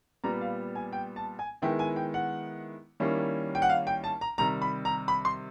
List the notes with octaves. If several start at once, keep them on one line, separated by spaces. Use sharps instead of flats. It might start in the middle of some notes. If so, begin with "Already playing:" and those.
A#2 G3 B3 A#5
F5
G#5
G5
A5
G#5
D#3 G#3 B3 E4 G5
G#5
G5
F#5
D#3 G3 A#3 C#4 E4
G5
F#5
F5
G5
A5
A#5
C3 D#3 G3 A#5
B5
A#5
B5
C6